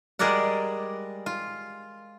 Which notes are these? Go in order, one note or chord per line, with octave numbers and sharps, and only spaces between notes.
G3 G#3 G#4 A#4 D5 F#5
F4